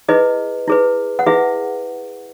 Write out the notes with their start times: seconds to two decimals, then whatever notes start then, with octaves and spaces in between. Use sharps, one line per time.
0.08 E4 G#4 B4 D#5
0.68 E4 G#4 B4
1.19 F#5
1.26 E4 G#4 B4 E5